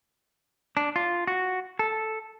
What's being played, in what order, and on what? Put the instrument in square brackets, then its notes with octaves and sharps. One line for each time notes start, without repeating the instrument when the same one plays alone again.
[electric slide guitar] D4
F4
F#4
A4